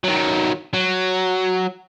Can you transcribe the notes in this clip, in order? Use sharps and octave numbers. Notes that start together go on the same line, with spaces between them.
D#3 F#3
F#3